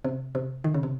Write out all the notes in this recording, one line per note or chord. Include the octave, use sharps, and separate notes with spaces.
C3
C3
D#3
C#3
C3